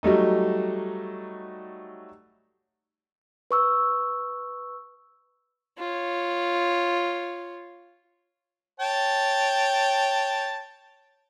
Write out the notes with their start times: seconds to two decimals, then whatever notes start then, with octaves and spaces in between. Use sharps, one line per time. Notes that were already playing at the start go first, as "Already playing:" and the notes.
0.03 F#3 G3 A3 D#4
3.51 B4 C#6 E6
5.78 F4 C#5
8.80 C#5 G5 A5